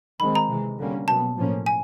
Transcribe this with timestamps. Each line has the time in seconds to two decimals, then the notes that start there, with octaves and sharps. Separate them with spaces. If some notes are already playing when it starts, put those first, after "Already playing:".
0.20 D#3 G#3 C4 B5
0.35 A#5
0.50 C3 E3 G#3
0.78 D3 G3 A#3 C#4
1.08 B2 F#3 B3 A5
1.38 A2 F3 A#3 C#4
1.66 G#5